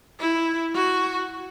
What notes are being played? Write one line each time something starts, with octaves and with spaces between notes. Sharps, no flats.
E4
F#4